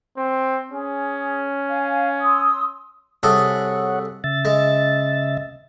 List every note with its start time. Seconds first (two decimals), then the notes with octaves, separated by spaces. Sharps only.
0.17 C4
0.71 C#4 G#4
1.69 F5 G#5
2.22 C6 D#6 E6
3.23 C2 G#4 A4 C#5 F#5
4.24 C#3 E5 A6
4.45 G#3